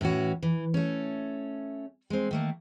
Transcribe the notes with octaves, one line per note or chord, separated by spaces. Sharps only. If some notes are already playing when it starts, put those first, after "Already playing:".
A2 E3 C#4 F#4
E3
A3 C#4
G#3 C4
D#3 A3 A#3